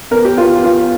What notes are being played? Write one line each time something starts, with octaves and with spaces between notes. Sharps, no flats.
E2 A#4
G4
E2 F4
E2 F4